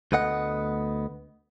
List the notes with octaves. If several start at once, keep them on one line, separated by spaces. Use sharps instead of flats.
D2 A3 B3 D#5 F#5